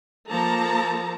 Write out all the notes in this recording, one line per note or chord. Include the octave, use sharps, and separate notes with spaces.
F3 A#3 A4 A5 A#5